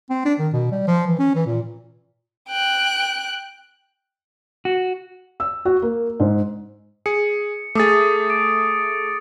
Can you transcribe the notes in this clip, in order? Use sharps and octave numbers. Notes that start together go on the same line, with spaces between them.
C4
D4
D#3
B2
G3
F3
E3
C#4
E3
A#2
G5 F#6
F#4
E6
F#4
A#3
G#2
G#4 C#7
A3 G#4 D6 D#6 A6
D6 A6 D7